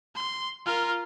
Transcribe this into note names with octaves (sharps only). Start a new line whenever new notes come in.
C6
F4 A#4